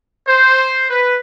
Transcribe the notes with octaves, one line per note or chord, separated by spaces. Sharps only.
C5
B4